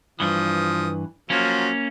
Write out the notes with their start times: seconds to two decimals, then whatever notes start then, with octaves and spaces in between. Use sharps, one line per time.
0.20 G2 E3 F3 D#6
1.30 F3 F#3 A#3 C#4 F4